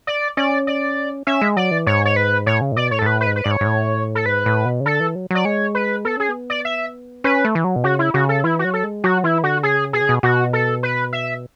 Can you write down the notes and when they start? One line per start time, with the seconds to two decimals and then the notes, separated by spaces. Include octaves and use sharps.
0.07 D5
0.37 C#4 D5
0.67 D5
1.27 C#4 E5
1.42 G#3
1.56 F#3 D5
1.71 E3
1.87 G#2 C#5
2.05 C#5
2.16 B4
2.46 A2 C#5
2.61 C#3
2.72 A2
2.76 B2 D5
2.91 A2 C#5
2.99 A4
3.02 G#2
3.06 A2 B4
3.21 B4
3.26 G#2
3.36 B4
3.44 G#2 D5
3.51 C#5
3.61 G#2
3.66 A2
4.15 A4
4.26 G#2 B4
4.46 A2
4.65 B2
4.80 C#3
4.85 D3 A4
5.00 E3
5.15 F#3
5.31 F#3 D5
5.45 G#3 C#5
5.75 B4
6.05 B3 A4
6.17 C#4 G#4
6.29 B3
6.50 D5
6.65 E5
7.24 C#4 B4
7.45 A3
7.55 E3
7.64 F#3
7.76 B2
7.84 C#3 F#4
7.99 E4
8.14 C#3 F#4
8.29 A4
8.44 E3 E4
8.59 F#4
8.64 F#3
8.74 A4
8.84 G#3
9.04 F#3 F#4
9.24 E3 E4
9.43 D3 F#4
9.63 C#3 G#4
9.93 B2 G#4
10.01 C#3
10.09 B2
10.23 B2 F#4
10.53 A4
10.83 B4
11.13 E5